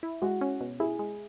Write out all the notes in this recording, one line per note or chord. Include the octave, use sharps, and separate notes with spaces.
E4
G#3 F#4
C#4
B2
E4 G#4
G#3